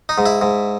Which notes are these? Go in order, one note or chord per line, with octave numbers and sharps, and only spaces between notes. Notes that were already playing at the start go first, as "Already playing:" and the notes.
D#4
G#2
E4
G#2